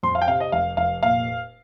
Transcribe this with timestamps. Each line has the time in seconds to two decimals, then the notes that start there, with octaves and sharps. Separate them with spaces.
0.03 F2 C6
0.15 F5
0.21 G5
0.28 C3 F5
0.40 D#5
0.52 F1 F5
0.77 F1 F5
1.03 A#2 F5